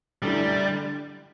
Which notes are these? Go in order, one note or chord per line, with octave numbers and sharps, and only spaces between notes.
F#2 D3 G3 A3 E4
D3